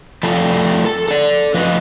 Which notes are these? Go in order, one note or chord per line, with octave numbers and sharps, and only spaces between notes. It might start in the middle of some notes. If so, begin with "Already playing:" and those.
F3 G3 A3 A4
A4 A5
A4 D5
F3 B4 D#5